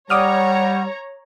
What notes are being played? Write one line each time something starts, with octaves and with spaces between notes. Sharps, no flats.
G3 C#5 F#5 A#5 D6 D#6 F6